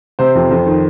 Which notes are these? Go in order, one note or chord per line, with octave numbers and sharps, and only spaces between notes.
C3 C5
F2
F2
D#3